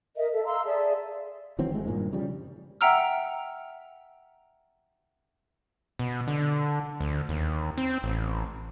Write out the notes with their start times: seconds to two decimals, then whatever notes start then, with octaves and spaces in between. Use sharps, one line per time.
0.16 A#4 D#5 E5
0.32 A4 E5
0.46 F5 A#5 C6 E6
0.65 G#4 D5 E5 A5
1.59 D#3 E3 F#3 C4
1.72 G#1 G#2 G#3 A3
1.85 G2 A#2 D#3 G#3
2.13 C#3 F3 G3
2.81 E5 F#5 G5 A#5 E6 F6
5.99 B2
6.28 D3
7.00 D2
7.29 D#2
7.78 C4
8.03 A1